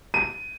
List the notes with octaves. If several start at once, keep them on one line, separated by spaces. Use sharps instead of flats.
D#7